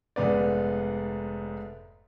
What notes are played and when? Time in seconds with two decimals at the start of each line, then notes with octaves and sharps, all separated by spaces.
0.16 F1 G#2 B3 D5